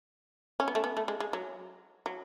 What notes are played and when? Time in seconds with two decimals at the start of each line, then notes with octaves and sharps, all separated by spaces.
0.60 C#4
0.68 B3
0.75 A3
0.84 B3
0.97 A3
1.08 G#3
1.20 G#3
1.33 F#3
2.06 F#3